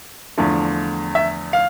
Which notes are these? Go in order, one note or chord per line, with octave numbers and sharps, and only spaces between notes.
E2 D3 F3 A3
E5
F5